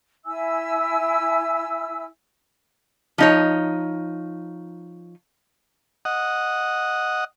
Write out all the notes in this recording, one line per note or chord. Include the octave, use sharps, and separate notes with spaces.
E4 E5 G#5 E6
F3 D#4 C#5
D#5 F#5